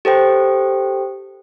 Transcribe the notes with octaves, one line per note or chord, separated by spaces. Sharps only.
G4 A4 C5 G5